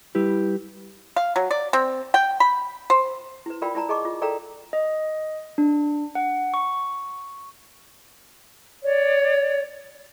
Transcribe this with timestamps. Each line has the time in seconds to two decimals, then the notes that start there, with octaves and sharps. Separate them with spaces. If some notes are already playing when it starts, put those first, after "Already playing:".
0.15 G3 E4 G4 B4
1.16 F5
1.36 F#3
1.51 D5
1.73 C4
2.14 G5
2.40 B5
2.90 C5
3.46 E4 B4
3.62 F4 A#4 D5 F5 G5 B5
3.75 E4 D5 A5 A#5
3.89 G#4 D#5 A5 C#6 D6
4.05 F4
4.22 A4 A#4 D5 F5 G5 A#5
4.73 D#5
5.58 D4
6.15 F#5
6.54 C#6
8.83 C#5 D5